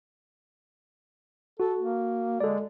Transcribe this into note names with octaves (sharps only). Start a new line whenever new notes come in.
F#4 A4
A#3
G#3 A4 D5